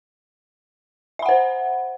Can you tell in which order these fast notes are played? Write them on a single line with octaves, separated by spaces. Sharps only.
E5 B5 F#5 C5